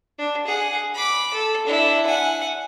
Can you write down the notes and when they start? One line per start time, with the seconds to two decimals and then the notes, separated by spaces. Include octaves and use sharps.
0.18 D4
0.47 G#4 F#5
0.95 B5 D6
1.34 A4
1.67 D4 E4
2.06 F#5 G#5